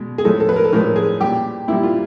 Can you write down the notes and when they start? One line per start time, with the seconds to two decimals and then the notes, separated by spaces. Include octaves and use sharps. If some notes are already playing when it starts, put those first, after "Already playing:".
Already playing: B2 G#3
0.18 G#4
0.25 A2 F3 G#3 A4
0.40 A4
0.49 B4
0.56 A#4
0.64 A4
0.73 A2 F3 G#3 A#4
0.96 G#4
1.20 A#2 G3 G4
1.68 A#2 G3 E4
1.83 F4